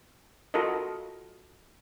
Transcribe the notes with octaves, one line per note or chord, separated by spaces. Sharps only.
F4 F#4 A4 A#4 D#5